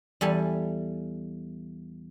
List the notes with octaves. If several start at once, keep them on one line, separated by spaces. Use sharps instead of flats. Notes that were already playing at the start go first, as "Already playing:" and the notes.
E2 G3 A4 G#5